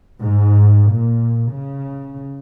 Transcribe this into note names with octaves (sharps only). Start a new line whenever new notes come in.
G#2
A#2
C#3